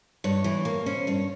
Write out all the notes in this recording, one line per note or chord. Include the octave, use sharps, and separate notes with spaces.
G2 C#5
E3
A#3
C#4 C5
G2 C#5